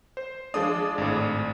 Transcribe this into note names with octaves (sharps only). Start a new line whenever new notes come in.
C5
F3 G#3 D4 D#6
G#1 A2